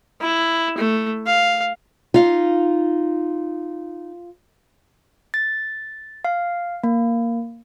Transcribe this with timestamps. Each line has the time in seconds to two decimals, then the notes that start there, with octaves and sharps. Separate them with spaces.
0.21 E4
0.77 A3
1.26 F5
2.14 D#4 F4 F5
5.34 A6
6.25 F5
6.83 A#3